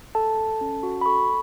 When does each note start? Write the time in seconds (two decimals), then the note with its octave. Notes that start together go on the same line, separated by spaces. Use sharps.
0.15 A4 A5
0.38 A4
0.61 C#4
0.83 F#4
1.01 B5
1.06 A4 C#6